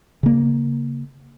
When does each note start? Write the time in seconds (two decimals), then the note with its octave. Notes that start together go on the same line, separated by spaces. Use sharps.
0.23 C#3 A#3